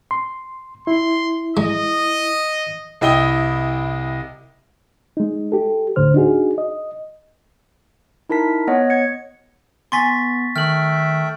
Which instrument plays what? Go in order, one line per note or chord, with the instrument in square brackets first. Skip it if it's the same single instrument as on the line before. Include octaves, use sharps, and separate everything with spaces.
[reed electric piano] C6
[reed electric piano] E4 [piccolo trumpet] C6
[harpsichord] G#3 [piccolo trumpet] D#5
[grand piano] C2 E4 D#5 G5 D#6 G7
[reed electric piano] G#3 D#4
G4 A4
D2 A2 D3 C5 F6
D4 D#4 F#4 G#4
D#5
[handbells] D#4 E4 A#4 A5 B6
B3 C#5 D#5 F#5
G#6 C#7
[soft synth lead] B3 [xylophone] G#5 C6 [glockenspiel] C#6 A6 B6
[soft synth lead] D#3 [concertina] A3 E5 G5 [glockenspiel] F6 F#7